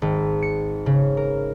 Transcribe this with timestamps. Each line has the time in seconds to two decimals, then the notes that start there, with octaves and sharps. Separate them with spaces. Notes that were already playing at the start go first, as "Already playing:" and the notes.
0.02 G#1
0.42 C#7
0.86 C#3
1.17 A#4